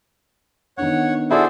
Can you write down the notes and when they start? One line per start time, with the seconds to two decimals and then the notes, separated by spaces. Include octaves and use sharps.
0.78 D#3 B3 D4 C#5 F#5
1.31 E4 F#4 G#4 A4 C5 D5